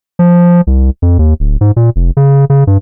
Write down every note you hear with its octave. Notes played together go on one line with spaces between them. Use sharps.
F3
C2
F2
D#2
D1
G#2
A#2
F1
C#3
C#3
G2